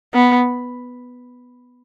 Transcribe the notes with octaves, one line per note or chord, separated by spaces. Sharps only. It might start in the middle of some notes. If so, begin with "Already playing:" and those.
B3